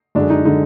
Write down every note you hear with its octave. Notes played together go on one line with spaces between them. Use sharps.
F#2 D3 G#3 D4
D#4
D3 G#3 D#4